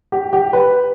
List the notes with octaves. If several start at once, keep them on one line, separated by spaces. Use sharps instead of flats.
G4
G4
B4